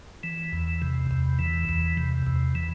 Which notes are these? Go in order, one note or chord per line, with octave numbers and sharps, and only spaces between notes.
E3
E2
C3
E2
E3
E2
C3
E2
E3